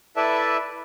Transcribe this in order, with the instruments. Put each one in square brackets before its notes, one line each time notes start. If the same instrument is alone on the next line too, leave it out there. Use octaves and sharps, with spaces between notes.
[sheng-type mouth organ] E4 A4 B4 D5 E5 A5